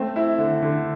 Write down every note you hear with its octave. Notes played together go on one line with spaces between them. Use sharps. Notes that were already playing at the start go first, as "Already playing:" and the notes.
Already playing: A3 C4
E4
D3
D3